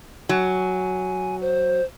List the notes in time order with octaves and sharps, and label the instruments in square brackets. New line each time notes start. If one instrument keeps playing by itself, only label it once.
[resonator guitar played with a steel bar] F#3 [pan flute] G#5
[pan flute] C5